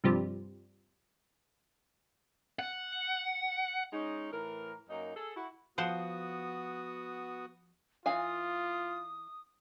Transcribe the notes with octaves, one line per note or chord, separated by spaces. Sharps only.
G2 C3 F3 G3
F#5
G#3 C#4 D#4
A2 E3 A#4
F#2 A#3 D#4
G#4 A4
E4 F#4
F3 B3 F#4 C5 F#5 D#6
E3 F4 F5 G#5 D#6